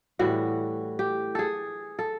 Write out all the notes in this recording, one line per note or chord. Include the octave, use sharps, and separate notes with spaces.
A2 E3 G3 F#4
G4
G#4 A4
A4